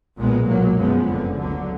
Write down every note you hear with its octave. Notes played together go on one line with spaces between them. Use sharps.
B1 A#2 G#3 B3
B1 A#2 F#3 A#3
F#2 F3 G#3 B3
F#1 F2 D3
D2 D3 F#3